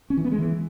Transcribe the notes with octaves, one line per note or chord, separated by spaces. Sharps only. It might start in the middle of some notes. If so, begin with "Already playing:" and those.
C#4
E3
B3
G#3
E3